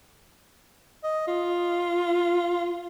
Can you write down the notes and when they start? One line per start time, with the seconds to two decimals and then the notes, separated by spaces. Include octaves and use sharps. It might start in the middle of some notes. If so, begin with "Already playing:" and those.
1.03 D#5
1.27 F4